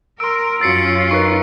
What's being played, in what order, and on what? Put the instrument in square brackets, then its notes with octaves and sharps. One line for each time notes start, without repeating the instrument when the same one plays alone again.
[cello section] A#4 [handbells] C6 E6 [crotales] D7
[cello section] F#2 C#4 F4 [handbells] F#4 A6 [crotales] E6 C7 C#7
[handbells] D#4 A#4 B4 [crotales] C#6